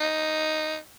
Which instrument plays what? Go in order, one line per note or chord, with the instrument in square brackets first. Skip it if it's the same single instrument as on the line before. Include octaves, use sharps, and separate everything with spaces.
[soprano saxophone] D#4